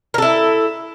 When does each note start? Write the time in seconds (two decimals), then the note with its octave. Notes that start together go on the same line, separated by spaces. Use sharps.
0.14 A#4
0.18 A4
0.22 E4